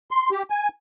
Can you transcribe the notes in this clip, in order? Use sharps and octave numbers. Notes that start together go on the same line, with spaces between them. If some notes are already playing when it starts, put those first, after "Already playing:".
C6
G4
G#5